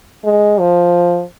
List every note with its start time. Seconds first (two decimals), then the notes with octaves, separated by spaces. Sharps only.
0.25 G#3
0.60 F3